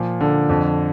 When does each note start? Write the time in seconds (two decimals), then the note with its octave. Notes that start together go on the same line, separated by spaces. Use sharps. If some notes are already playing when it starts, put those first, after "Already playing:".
Already playing: A#2 F3
0.21 D3
0.49 F2